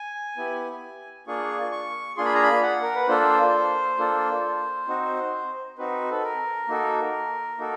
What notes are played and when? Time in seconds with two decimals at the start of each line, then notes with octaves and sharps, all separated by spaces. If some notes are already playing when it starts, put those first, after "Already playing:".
Already playing: G#5
0.37 B3 E4 G4
1.27 A#3 D4 F4 G#4 C#6
1.72 C#6
2.17 A#3 D4 F4 G#4 C6
2.25 B5
2.34 A#5
2.43 B5
2.62 F#5
2.83 A#4
2.95 B4
3.07 A#3 D4 F4 A4 C5
3.98 A#3 D4 F4 A4
4.88 C4 D#4 F#4
5.78 C4 D#4 F#4 B4
6.11 A4
6.23 A#4
6.68 A#3 D#4 F#4 A4
7.58 A#3 D#4 F#4 A4